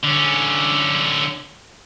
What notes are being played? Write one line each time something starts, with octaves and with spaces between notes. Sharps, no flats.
D3 C#4